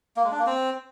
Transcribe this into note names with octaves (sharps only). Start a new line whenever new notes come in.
A#3
G#3
D4
A#3
C4